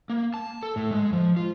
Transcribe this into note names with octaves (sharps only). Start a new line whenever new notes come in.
A#3
A5
A4
A2
G#3
F3
F4